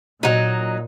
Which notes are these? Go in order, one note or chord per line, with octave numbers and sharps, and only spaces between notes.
A#2 F#3 D#4